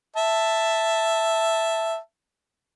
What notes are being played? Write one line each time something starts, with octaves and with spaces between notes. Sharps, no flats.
E5 A5